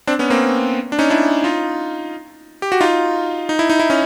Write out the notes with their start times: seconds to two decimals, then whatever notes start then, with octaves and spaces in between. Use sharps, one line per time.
0.07 C4 D4
0.19 B3 C#4
0.30 A#3 C4
0.92 D4
0.99 C#4 D#4
1.10 D4 E4
1.44 D#4 F4
2.62 G4
2.72 F#4
2.81 D#4 F4
3.49 D#4
3.59 E4
3.70 D#4
3.79 E4
3.90 C#4 D#4